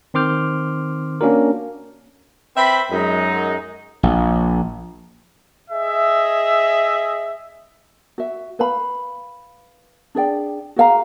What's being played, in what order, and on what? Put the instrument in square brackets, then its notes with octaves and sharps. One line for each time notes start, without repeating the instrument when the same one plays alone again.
[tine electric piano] D#3 C4 C6 D6 F6 G6
A#3 C#4 D4 F#4 A#4
[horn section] C4 B4 E5 B5
F#2 G#3 D#4
[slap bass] A#1
[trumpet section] G#4 D#5 E5
[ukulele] F#4 E5
B4 F5 B5
D4 G#4 D5 G5
F#4 G#4 F5 A#5